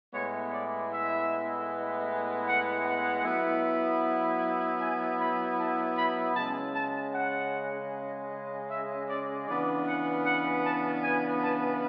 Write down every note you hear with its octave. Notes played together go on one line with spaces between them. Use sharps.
A2 G#3 B3 E4 C#5
D5
E5
F#5
F#5
F#3 B3 E4
G#5
B5
A5
B5
C#3 G#3 C#4 A5
A5
F#5
E5
D5
C#3 E3 B3 D4 D5
F#5
F#5
A5
G#5
A5